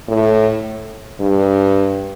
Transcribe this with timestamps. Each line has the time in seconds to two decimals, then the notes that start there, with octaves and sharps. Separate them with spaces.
0.08 A2
1.21 G2